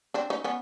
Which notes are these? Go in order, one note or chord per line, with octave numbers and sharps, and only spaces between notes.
C4 D4
C#4 D#4
B3 C#4